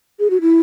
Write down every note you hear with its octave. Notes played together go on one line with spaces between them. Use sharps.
G#4
F#4
E4